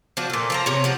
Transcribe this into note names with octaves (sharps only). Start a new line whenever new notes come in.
F3 D4 F#4
A#2 A4
F3 C4 A#5
C3 C#5
F3 F4 F#5